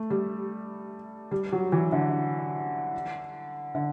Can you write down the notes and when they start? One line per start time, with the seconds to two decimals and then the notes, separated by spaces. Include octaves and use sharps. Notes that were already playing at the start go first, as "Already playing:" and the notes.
Already playing: A3
0.10 G3
1.31 G3
1.52 F#3
1.72 E3
1.92 D3
3.75 D3